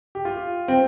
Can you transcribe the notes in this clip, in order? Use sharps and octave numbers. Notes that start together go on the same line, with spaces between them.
G4
F4
C4